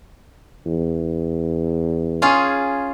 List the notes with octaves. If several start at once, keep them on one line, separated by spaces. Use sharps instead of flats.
E2
C#4 F4 G#4